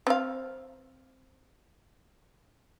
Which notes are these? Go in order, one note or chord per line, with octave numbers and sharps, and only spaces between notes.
C4 F5